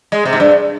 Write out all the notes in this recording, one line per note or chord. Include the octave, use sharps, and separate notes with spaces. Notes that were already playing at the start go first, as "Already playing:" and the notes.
G#3
C3
G#2
G2